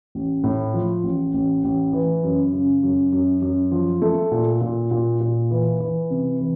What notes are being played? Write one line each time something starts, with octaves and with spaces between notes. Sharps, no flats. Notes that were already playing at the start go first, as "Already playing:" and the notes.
A1
A2
F3
A1
A1
A1
E3
F#2
C#3
F#2
F#2
F#2
F3
A3
A#2
A#2
A#2
A#2
E3
E3
C3
E3